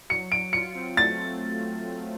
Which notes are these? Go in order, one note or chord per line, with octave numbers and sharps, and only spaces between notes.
F#3 C#7
F#3 D7
F4 C#7
C4
A3 A6